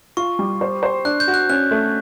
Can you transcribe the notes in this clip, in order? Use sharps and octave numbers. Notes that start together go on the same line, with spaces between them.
F4 C#6
G3
C5
C5
D4 F#6
G6
F#4
F#6
C#4 F#6
A3